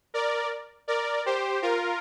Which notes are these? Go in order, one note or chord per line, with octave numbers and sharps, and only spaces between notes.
A#4 D5
A#4 D5
G4 C5
F4 A#4